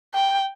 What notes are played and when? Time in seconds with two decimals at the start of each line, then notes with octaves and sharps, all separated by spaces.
0.14 G5